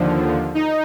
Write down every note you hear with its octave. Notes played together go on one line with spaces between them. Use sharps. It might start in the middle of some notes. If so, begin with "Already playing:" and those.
Already playing: D#2 D3 F3
D#4